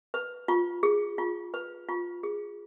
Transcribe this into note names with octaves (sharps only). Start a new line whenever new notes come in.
B4
F4
G#4
F4
B4
F4
G#4